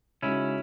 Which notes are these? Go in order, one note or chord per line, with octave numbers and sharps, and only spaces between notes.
C#3 G#3 C#4 D#4 E4 F#4